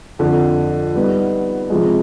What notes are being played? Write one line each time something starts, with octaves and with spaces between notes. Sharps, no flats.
F2 D3 F3
G3 B3 D#4
C3 F3 G#3